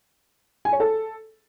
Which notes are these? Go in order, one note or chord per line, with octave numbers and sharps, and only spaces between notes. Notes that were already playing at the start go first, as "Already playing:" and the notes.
G#5
C#5
A4